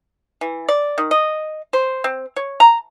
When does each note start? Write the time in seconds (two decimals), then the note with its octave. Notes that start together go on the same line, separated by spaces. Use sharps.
0.41 E3
0.69 D5
0.98 D#3
1.11 D#5
1.73 C5
2.04 C4
2.36 C#5
2.60 A#5